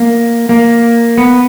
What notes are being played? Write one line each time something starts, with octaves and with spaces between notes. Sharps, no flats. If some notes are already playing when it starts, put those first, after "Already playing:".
Already playing: A#3
A#3
B3